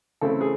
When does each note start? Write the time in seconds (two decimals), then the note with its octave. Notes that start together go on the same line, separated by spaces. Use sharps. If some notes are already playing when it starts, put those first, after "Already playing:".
0.21 C#3 E3 A3 C4 E4 A4
0.41 G#4